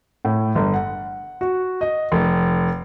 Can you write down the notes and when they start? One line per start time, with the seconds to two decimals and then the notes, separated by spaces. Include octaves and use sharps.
0.25 A2
0.55 G1
0.74 F#5
1.41 F#4
1.81 D#5
2.12 F1